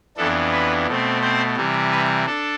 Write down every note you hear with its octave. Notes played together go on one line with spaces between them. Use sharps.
F2 E3 B3 D4 A4
B4
B2 A3 C4
C4 C5
C3 E3 G3
B4
D4 A4